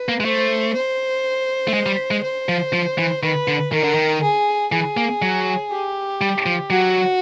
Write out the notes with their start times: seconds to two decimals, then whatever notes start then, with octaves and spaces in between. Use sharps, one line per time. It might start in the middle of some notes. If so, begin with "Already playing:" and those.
Already playing: B4
0.09 A#3
0.20 G#3
0.25 A3 C5
0.74 C5
1.68 A3
1.74 G#3
1.86 G3
2.11 G#3
2.24 C5
2.49 F3
2.73 F3
2.98 E3
3.23 D#3 B4
3.48 D3
3.72 D#3 A#4
3.84 D3
3.94 D#3
4.22 G#4
4.72 E3 G#4
4.97 A#3
5.22 F#3
5.71 G4
6.21 G3
6.46 F3
6.70 F#3 F#4